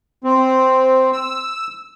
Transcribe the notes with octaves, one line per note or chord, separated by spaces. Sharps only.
C4
E6